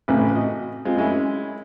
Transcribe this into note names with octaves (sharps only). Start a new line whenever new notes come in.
A1 F2 A2 C#3 E3
F#4 D#5
G#3 C4 F4
F#2 G#3 C#4 E4